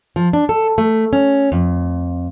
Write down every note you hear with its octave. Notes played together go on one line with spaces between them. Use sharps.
F3
D4
A4
A3
C#4
F2